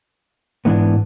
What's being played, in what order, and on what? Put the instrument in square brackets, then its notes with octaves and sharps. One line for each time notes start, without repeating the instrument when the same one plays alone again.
[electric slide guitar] G#2 E3 B3 D4